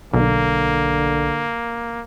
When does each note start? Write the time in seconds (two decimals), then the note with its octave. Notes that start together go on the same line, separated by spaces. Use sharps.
0.14 B1 D3 A#3